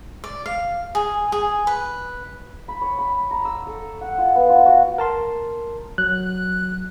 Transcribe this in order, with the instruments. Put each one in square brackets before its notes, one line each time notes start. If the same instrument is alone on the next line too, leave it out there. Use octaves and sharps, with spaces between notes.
[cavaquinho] D5
F5
G#4
G#4
B4
[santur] B5
C#5
B5
A#5
E6
A4
F#5
F4
B3
F4
F#4
[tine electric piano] A#4 A5 C6
[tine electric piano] F#3 [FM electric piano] F#6